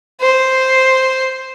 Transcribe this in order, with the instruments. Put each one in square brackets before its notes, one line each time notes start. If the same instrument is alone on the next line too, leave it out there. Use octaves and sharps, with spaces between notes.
[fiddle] C5